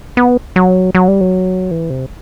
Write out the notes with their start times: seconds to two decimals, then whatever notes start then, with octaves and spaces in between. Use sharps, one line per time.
0.17 B3
0.56 F#3
0.95 F#3
1.08 G3
1.21 F#3
1.71 E3
1.90 C3